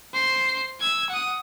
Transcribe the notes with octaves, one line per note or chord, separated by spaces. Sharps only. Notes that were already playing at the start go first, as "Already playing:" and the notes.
C5 C7
E6 G#6
F#5 D#6